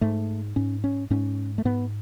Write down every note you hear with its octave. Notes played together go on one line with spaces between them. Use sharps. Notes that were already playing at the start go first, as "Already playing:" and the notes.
G#2 A3
G#2 C#4
C#4
G#2 C#4
A3
G#2 B3